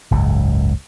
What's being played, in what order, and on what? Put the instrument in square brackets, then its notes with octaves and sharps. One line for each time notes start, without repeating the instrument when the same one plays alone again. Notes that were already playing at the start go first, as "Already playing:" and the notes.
[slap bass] F#1 C#2 G#2 C#3